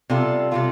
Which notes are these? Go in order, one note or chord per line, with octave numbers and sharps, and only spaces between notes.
C3 G3 F4 A4
C3 G3 F4 A4